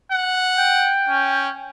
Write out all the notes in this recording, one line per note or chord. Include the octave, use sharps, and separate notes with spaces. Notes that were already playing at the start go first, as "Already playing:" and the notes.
F#5
G5
C#4